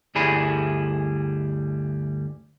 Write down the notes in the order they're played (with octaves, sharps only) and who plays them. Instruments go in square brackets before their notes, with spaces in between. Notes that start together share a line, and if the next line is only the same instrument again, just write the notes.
[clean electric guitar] D2 G2 G3 E4 G#4 B5